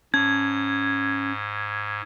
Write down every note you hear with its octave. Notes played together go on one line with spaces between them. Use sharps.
G#2 C#4 A5 G#6